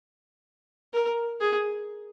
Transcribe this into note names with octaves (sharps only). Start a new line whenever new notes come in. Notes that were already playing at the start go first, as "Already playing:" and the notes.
A#4
G#4